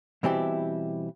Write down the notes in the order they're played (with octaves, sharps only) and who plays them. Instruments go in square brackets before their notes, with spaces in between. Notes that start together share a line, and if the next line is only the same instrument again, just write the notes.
[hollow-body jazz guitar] B2 E3 G3 C4 E4 G4